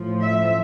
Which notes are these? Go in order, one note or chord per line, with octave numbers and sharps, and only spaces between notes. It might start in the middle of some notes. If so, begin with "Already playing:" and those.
Already playing: A2 F3
E5